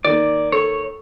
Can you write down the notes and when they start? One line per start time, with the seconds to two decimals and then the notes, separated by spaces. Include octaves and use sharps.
0.05 D#3 A#3 D5
0.52 A4 C#5 C#6